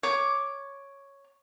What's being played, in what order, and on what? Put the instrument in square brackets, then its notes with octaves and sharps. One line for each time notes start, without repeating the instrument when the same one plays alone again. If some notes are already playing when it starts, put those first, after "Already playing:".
[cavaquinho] C#5 D6